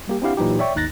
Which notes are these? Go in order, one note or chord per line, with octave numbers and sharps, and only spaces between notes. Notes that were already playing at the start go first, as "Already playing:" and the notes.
G3 A#3 G4
C4 D4 E4 G4 F5 F#5
A#2 E3 F#3 D#4 G4
C#5 D5 E5 G5 C#6
G#1 D#2 D#4 F#6 A6 A#6